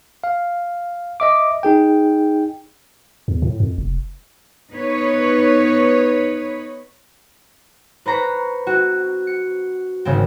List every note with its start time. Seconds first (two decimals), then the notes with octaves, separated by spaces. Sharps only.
0.24 F5
1.20 D#5 E5 D6
1.63 D#4 G#4 G5
3.28 E2
3.42 A2
3.60 F2
3.78 F1
4.72 B3 D#4 B4 C#5
8.06 B4 C5 A#5 C#6 B6
8.67 C4 F#4
9.27 C#7
10.05 G#1 C#3 C4